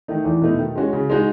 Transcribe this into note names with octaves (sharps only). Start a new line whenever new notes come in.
D#3 A3 D#4
E2
B2 A3 D#4
D#3
G#3 C#4 F#4
C#3
G#3 D#4 F#4